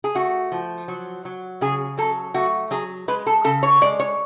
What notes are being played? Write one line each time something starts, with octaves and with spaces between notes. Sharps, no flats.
G#4
A3 F#4
F3
F#3
F#3
C#3 G#4
F#3 A4
A3 F#4
F#3 G#4
G#3 B4
A4
C#3 A4
C#5
G#3 D5
C#5